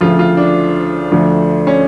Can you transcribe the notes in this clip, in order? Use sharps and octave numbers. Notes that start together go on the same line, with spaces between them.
D2 C#3 F3 A3 F4
F4
D4
D2 D3 F3 A3
C#4